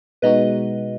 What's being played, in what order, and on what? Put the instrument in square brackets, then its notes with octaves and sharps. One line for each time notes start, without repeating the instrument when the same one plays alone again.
[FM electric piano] B2 G#3 D#4 F#4 [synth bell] B4 D#5